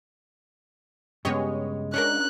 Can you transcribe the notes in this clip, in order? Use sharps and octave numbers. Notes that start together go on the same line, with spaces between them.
G2 C#3 G#3 B3 G4 C#5 D#5
C#4 D4 A#4 F#6